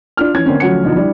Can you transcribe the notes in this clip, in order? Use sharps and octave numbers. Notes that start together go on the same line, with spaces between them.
D4 F4 F6
E3 C#4 G#6
D3 A#3 C4 C#4
D2 F3 F#3 C#4 F#5 C#7
B2 D3 F3 D#4
G3 D4 E4